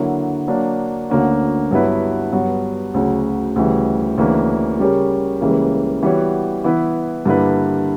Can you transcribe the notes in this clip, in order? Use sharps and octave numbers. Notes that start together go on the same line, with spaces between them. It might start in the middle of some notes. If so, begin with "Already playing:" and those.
Already playing: D3 F#3 A#3 E4 A#4
F#3 A#3 D4
D2 D3 A#3 C#4 F#4
G2 F#3 B3 E4 B4
G2 F#3 B3
D2 C#3 F#3
D2 C#3 E3 G3
D2 C#3 E3 A#3 D4
C#3 G3 C#4 G4 A#4
C#2 C#3 E3 G3 A#3
E3 G3 B3 F#4 C#5
E3 B3 E4 B4
G2 D3 A#3 E4 B4